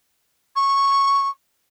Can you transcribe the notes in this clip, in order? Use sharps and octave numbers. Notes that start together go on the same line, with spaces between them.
C#6